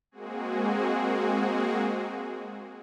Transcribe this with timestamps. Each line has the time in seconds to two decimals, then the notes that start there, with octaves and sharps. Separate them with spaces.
0.11 G#3 A#3 C4 F#4 G#4